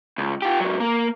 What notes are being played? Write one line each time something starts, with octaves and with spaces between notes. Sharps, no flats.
C#2
F4 G4
G#2 F#3
A#3 A#4